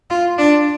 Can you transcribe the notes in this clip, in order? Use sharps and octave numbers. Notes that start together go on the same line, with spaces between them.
F4
D4